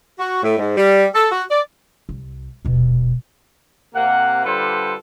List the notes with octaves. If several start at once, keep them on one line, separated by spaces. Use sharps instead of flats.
F#4
A2
G#2
G3
A4
F#4
D5
C2
D#1 B2
C3 A#3 F#5
D3 G3 F4 A4 B4 C5